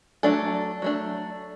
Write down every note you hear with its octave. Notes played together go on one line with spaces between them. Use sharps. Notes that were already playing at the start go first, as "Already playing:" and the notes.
F#3 A3 D4 A4
F#3 A3 D4